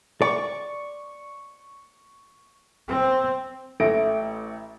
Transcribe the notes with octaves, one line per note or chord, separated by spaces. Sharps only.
D5 C#6
C4
A1 A3 A#6 D7